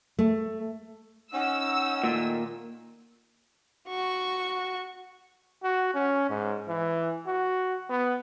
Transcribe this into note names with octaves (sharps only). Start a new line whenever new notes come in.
A3
C#4 D#4 F#5 E6
A#2 D#3 A3
F#4 C#6
F#4
C#4
G#2
E3
F#4
B3